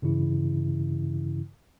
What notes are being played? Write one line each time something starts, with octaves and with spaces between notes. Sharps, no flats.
G2 C#3 E3 E4